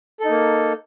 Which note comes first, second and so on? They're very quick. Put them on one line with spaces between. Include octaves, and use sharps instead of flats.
A4 D#4 A#3